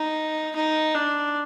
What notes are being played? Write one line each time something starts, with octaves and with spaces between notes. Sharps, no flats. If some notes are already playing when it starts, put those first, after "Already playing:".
Already playing: D#4
D#4
D4